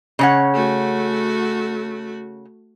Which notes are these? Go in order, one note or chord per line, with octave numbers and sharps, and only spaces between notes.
C#3 C#4 F#5
A3 F#4